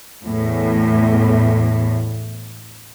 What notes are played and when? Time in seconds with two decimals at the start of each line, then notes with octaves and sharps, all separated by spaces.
0.24 E2 A2